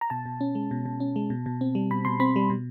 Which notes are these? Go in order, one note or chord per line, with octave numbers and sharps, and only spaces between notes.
A#5
B2 A5
B2
C#4
G#3
B2
B2
C#4
G#3
B2
B2
C4
G3
B2 B5
B2 C6
C4 B5
G3
B2